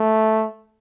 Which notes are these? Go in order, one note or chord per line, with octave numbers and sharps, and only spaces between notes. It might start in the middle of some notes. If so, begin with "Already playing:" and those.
Already playing: A3